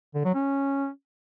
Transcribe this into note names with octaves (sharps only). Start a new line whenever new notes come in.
D3
F#3
C#4